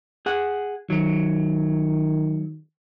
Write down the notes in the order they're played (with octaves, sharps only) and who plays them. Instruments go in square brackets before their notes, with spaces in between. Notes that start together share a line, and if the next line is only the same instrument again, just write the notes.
[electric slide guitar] G#4 F#5
[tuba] D#3 [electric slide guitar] F#3